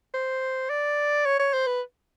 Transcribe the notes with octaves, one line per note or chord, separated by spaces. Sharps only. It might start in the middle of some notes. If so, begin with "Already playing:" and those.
C5
D5
C#5
C#5
C5
B4